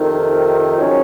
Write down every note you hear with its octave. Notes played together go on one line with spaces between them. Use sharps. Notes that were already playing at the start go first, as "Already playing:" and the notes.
Already playing: F2 C3 D#3
G#2 F#3 C#4